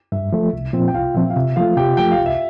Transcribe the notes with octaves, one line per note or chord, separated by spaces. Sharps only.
G2 E5
F3 A3
C2
A#2 F3 C4
G5
C2 F4 F5
A#2 F3 C4 E5
F5
C3 E5
F3 A3 F4 F5
C3 G4 G5
F3 A3 G5
F5
C2
E5